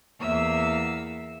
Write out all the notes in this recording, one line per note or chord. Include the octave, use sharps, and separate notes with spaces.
E2 A#3 E5 F5 E6